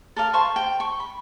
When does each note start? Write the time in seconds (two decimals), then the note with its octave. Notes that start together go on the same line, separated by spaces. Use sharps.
0.17 A4 A#4 D5 F5
0.33 C5 A5 C6 C#6
0.56 G5
0.80 C#6
1.00 B5